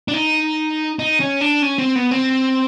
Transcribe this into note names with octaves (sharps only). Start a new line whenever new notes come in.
D4
D#4
D#4
C#4
D4
C#4
C4
B3
C4